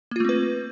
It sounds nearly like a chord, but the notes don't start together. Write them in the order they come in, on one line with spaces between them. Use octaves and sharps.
A#3 F4 A3 C4 B4